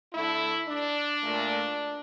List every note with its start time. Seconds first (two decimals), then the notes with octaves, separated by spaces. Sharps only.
0.13 D3 A3 E4
0.68 D4
1.22 A#2 A3